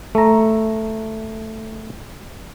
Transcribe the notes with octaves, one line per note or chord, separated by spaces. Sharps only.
A3 A#5